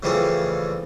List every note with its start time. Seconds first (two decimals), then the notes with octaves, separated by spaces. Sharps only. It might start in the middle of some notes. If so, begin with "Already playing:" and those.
0.03 C#3 E3 F3 G3 A3 G#4